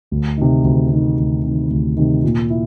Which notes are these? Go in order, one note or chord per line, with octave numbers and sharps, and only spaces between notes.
D2
C3 D#3
D2
C3 D#3
D2
C3 D#3
D2
C3 D#3
A#2
E4